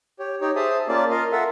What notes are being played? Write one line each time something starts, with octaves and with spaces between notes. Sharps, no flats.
G4 C#5
D#4 G4 C#5
G#4 C5 E5 A5 D#6
A#3 C#4 F4 D5 A5
F4 A#4 D#5 F5
F4 A4 A#4 E5 F#5